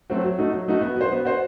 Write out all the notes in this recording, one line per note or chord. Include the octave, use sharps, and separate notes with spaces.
F#3 A3 C4 F#4
F#3
A3 D#4 F#4
F#3
A3 D#4 F#4
B3
F#4 C5
B3
F#4 C5